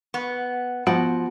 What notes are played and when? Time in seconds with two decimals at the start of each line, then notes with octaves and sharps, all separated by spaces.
0.14 B3
0.87 F3 B3 F#4